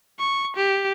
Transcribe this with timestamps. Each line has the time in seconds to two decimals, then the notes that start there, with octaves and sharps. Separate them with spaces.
0.19 C#6
0.56 G4